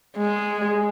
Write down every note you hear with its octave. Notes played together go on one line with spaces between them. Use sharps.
G#3